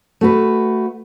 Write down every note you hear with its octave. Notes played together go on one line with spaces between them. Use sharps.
A3 F#4 B4